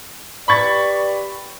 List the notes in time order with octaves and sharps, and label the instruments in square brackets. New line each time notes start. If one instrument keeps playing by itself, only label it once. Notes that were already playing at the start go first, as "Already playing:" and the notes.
[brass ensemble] G4 B4 D5 [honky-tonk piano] B5 C#6 A6